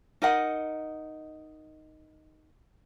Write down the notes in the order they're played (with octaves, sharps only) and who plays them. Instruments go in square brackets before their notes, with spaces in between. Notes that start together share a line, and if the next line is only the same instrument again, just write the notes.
[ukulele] D#4 A#4 D#5 F#5